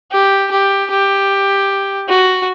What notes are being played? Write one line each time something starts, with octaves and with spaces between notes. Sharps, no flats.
G4
G4
G4
F#4